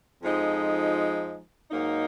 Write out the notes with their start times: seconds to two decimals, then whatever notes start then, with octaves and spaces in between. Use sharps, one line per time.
0.22 F2 F3 G#3 D#4
1.70 G#2 F#3 A#3 D#4